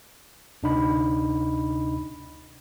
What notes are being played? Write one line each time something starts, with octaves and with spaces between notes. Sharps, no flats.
D2 C3 D4 D#4 D#5 B5